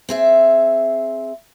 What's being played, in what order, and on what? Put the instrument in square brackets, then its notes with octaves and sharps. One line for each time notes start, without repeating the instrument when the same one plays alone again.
[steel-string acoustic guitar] C4 G#4 E5